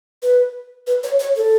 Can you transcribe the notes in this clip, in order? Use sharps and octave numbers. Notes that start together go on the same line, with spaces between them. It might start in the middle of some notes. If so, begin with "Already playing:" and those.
B4
B4
C#5
C#5
A4